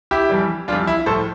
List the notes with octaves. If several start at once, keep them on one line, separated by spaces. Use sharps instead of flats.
E4 G4
F2 E3 G3
F2 E3 G3 D4 F4
E4
A2 F3 A4 C5